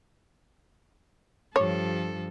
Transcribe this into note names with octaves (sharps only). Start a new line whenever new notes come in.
G2 F3 A4 C#5